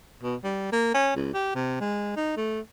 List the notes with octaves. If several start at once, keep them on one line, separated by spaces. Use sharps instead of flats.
B2
G3
A#3
C#4
C#2
G4
C3
G#3
D#4
A3